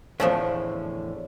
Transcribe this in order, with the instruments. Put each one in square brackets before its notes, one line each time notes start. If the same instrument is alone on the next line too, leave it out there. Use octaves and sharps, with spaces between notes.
[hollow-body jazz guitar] E2 A2 D3 [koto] F3 A3 C#4